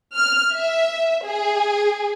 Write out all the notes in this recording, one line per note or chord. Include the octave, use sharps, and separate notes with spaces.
F6
E5
G#4